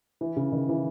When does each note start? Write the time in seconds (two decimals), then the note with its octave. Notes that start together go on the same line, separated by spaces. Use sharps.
0.21 E3
0.36 C#3
0.52 D#3
0.69 E3